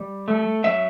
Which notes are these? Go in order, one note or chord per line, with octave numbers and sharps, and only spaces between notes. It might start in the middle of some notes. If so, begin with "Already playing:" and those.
Already playing: G3
A3
F#3 E5